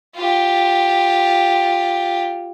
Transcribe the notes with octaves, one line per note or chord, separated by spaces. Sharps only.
F4 G4